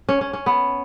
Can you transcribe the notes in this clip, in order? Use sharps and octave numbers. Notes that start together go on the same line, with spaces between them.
C#4
C#4
C#4
B3